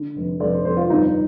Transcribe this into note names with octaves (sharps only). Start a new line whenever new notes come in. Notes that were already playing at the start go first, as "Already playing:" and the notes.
Already playing: D3
F1
F1 D5
C5
F1 C5
F4
G1 D#4